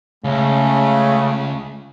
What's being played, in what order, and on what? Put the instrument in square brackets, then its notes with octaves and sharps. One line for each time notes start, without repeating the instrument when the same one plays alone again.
[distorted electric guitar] C#2 [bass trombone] C#3 [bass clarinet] A3